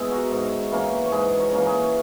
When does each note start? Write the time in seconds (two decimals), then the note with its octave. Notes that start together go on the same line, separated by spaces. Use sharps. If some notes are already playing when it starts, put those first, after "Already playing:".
Already playing: G#3 B3 E4 G#4 C#5
0.11 F#4 A#4
0.31 G#2
0.72 E3 A#3 C#4
1.06 C#5
1.12 G#2 G#4 B4
1.39 A#4 C#5
1.52 E3 A#3 C#4
1.66 G#4 B4